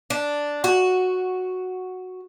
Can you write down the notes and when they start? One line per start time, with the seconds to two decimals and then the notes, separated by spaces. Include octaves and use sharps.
0.10 D4
0.64 F#4